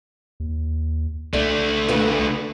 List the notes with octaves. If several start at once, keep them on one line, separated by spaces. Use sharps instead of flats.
D#2
C2 D3 A3 D5
B3 F4